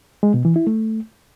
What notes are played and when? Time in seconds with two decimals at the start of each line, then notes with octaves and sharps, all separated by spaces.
0.23 G#3
0.34 B2
0.45 E3
0.56 E4
0.67 A3